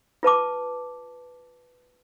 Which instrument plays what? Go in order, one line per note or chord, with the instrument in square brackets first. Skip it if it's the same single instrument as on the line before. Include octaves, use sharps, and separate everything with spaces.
[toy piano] F4 B4 A5 D6